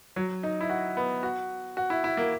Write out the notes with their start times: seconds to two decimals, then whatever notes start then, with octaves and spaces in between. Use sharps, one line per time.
0.16 F#3
0.43 D#4
0.61 E4
0.69 F#4
0.97 B3
1.23 F#4
1.77 F#4
1.90 E4
2.04 E4
2.17 A#3